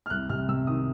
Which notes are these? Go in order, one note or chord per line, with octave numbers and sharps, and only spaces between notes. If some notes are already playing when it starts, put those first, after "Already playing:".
F6
C2 F#6
C3 F6
C3 E6
D#3 D#6